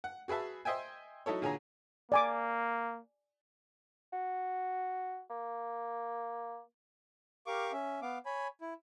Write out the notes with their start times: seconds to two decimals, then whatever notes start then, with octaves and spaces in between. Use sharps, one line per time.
0.04 F#5
0.28 F#4 G#4 B4 E5 A5
0.65 C5 D#5 E5 G5 G#5
1.26 F#3 D#4 E4 A4 C#5
1.42 A#2 D3 G#4 C#5 G#5 A#5
2.12 A#3 D5 G#5 D6
4.13 F#4
5.30 A#3
7.46 G4 A#4 F5 C#6 D6
7.72 C#4 E5
8.02 B3 F5 D6
8.26 C#5 G#5 B5
8.61 E4